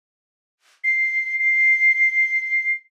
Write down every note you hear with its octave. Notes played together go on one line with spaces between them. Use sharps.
C7
C7